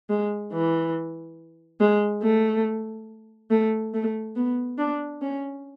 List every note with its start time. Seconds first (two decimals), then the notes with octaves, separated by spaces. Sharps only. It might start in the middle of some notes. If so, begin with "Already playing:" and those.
0.09 G#3
0.53 E3
1.81 G#3
2.22 A3
3.51 A3
3.94 A3
4.36 B3
4.78 D4
5.22 C#4